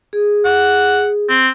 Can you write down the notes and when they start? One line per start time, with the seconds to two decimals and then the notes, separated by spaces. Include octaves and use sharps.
0.13 G#4
0.45 F#5
1.29 C4